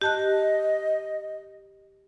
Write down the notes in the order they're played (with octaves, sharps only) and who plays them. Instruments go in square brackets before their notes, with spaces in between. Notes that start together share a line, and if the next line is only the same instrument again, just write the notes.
[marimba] G4 A5 F#6 [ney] D#5